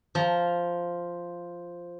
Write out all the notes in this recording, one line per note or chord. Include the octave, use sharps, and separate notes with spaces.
F3 A#5